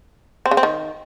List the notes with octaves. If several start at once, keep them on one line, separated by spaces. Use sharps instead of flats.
C4
C#3
C4
D#3